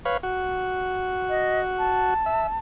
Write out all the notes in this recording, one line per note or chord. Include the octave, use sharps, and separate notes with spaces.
B4 C#5 F5
F#4
D#5
A5
E5